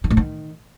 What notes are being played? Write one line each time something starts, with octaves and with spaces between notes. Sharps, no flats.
D#3
A2
D#3